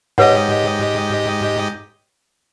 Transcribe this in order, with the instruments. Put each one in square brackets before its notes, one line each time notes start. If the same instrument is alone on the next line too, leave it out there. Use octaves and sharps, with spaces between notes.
[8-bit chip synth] G#2 G4 D#5 [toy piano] B4 C#5 F#5